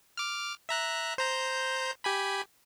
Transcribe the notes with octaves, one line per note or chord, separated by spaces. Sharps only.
D6 F6
E5 A#5 F#6
C5 A#5 G6
G4 G#5 B5